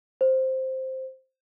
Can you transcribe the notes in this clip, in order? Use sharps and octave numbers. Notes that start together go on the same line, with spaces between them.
C5